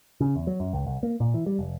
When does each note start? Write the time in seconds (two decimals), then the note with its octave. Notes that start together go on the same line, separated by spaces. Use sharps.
0.20 C#3
0.36 E2
0.47 F#3
0.60 F#2
0.73 C#2
0.87 C2
1.03 A#3
1.20 A#2
1.34 E3
1.46 G3
1.59 F1